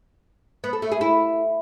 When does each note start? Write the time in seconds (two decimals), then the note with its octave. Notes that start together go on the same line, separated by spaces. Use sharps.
0.64 B3
0.73 A4
0.82 A3
0.92 G#4
1.01 E4